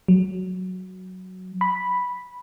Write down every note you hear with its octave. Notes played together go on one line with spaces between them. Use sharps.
F#3
B5